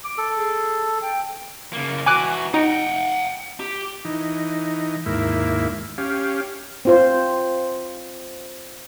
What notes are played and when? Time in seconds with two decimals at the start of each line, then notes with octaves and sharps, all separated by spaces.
0.04 D6
0.18 A4
0.37 G#4
1.02 G5
1.73 C#3 A#3
2.06 E3 F#4 G#5 D6 F#6
2.54 D#4 F#5 G5
3.60 G4
4.05 E3 D#4
5.06 D#2 G#2 A#3 E4
5.98 C#4 G4 F5
6.85 C4 F4 C5